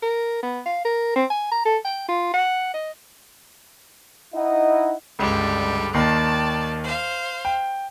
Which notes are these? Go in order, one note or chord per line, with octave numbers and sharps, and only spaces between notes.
A#4
B3
F5
A#4
C4
G#5
A#5
A4
G5
F4
F#5
D#5
D#4 E4 D#5 F#5
C#2 G2 D3 G3
D#2 D#3 D5 A5 C7
C5 F5
G5